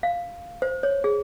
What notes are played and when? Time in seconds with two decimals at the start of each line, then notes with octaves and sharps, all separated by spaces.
0.03 F5
0.62 C5
0.83 C#5
1.04 G#4